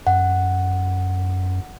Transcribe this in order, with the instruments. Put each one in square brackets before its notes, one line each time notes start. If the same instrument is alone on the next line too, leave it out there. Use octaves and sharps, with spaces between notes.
[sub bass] F#2 [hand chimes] F#5